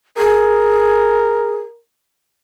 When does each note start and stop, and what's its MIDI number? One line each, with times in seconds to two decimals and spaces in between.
0.18 1.56 68
0.18 1.80 70